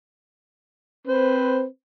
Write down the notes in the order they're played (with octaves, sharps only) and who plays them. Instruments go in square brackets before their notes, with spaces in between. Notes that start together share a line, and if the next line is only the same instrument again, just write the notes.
[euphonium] C4 [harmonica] B4 C5